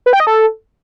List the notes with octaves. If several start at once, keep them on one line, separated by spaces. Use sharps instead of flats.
B4
G5
D#5
A4